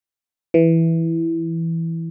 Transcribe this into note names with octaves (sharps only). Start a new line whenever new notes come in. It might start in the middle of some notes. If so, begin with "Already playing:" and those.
E3